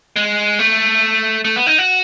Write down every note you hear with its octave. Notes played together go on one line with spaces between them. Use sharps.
G#3
A3
A3
B3
D#4
F#4